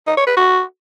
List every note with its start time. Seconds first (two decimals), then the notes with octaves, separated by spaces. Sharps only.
0.07 D#4
0.17 C#5
0.27 B4
0.37 F#4